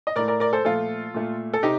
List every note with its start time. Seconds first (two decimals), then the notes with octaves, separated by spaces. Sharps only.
0.07 D#5
0.16 A2 A#4 D5
0.19 A3
0.28 A#4 D5
0.40 A#4 D5
0.53 A4 C5
0.65 A#2 F3 A3 F4 A4
1.14 A#2 A3
1.53 A4
1.63 C3 D#4 G4